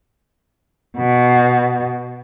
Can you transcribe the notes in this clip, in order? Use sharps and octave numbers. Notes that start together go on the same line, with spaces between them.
B2